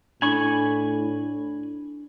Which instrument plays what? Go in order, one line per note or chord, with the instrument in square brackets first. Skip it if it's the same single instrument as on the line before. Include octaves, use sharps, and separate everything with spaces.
[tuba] A2 [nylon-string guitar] D4 [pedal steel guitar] G#5 B5 C#6